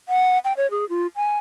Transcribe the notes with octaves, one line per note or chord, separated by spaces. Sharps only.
F#5
G5
C#5
G#4
F4
G#5